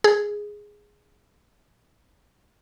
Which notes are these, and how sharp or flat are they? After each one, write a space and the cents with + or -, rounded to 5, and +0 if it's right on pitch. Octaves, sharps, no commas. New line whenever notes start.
G#4 +0